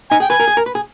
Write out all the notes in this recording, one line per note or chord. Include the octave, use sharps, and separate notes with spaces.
D#4 G#5
G#4 G5
B4 G#5
A#4
G#4
A#4
B4
G#4